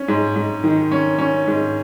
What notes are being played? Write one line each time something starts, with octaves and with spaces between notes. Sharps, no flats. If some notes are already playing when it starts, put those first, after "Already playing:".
Already playing: C#4
G#2
G#2
D#3
C#4
C#4
G#2